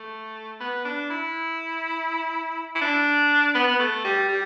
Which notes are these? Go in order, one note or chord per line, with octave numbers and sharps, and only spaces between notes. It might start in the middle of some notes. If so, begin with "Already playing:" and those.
Already playing: A3
B3
D4
E4
E4
D4
B3
B3
A3
G3
G3